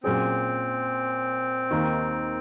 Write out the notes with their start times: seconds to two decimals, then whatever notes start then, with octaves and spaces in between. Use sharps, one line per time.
0.03 A#2 F#3 C4 C#4 G#4
1.71 D#2 D#3 A#3